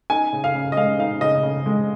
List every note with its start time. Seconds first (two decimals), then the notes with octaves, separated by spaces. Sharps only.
0.10 D#4 G#5
0.33 C#3
0.44 F5
0.55 C#3
0.72 D#5
0.77 G#3 F5
0.99 D#4 F5
1.21 C#3 D#5
1.43 C#3
1.66 G#3